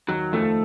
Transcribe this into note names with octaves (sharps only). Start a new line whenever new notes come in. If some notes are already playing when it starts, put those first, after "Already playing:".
D#2 D#3 F#3
F2 F3 A3